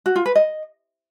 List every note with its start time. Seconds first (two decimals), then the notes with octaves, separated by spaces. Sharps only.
0.06 F#4
0.16 F4
0.26 B4
0.35 D#5